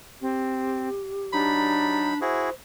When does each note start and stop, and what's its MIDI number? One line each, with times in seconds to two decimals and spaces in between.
0.22 0.89 60
0.22 1.99 67
1.33 2.14 54
1.33 2.19 62
1.33 2.14 63
1.33 2.16 83
2.21 2.50 64
2.21 2.50 66
2.21 2.50 68
2.21 2.53 72